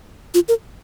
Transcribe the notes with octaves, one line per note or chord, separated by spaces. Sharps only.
F4
A#4